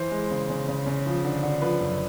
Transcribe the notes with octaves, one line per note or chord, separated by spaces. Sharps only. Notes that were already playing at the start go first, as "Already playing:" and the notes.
Already playing: E3 C5
G#3
C#3
C#3
C#3
C#3
F3
D3
D3
F3 B4
F#2